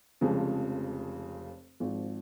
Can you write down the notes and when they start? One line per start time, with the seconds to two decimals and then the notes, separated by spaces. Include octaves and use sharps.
0.21 F1 F2 C#3 F3 G#3
1.80 G#1 G#2 F3